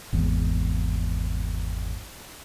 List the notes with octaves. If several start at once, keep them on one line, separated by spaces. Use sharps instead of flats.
G#1 E2